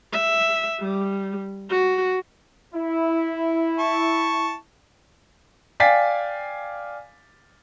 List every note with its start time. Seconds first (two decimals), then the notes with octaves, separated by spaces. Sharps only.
0.12 E5
0.80 G3
1.70 F#4
2.74 E4
3.79 A5 C#6
5.80 D5 F5 G5 G#5 A6 B6